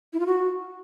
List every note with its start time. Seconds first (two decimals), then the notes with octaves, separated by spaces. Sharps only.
0.13 E4
0.20 F4
0.26 F#4